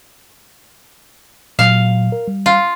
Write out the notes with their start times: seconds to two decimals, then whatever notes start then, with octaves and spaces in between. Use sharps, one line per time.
1.59 A#2 F#3 F5
2.12 A#4
2.28 G3
2.46 F4